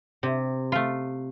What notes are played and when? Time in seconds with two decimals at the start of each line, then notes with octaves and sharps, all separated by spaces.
0.23 C3
0.72 A3 F4